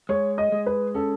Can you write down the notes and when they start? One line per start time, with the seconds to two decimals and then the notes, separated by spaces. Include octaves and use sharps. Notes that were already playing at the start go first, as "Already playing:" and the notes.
0.09 G#3 C#5
0.38 D#5
0.52 G#3
0.66 B4
0.95 C#4 A4